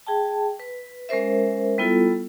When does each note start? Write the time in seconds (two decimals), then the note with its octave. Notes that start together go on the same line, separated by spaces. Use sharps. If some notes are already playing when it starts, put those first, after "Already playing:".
0.07 G#4 G5 A5
0.60 B4
1.09 G#3 C#4 A#4 C5 E5
1.78 G3 B3 E4 F4 A4